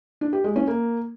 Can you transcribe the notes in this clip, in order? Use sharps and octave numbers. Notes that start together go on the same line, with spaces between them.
D4
G4
G#3
C#4
A#3